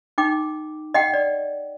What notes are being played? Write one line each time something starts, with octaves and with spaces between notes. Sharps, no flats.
D#4 G5 D6
D#5 F#5 G5
D5